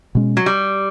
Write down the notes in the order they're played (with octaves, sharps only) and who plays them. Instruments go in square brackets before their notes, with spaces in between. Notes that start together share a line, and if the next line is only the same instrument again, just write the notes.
[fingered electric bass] B2 G#3 C#4
[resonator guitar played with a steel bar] F#3
G3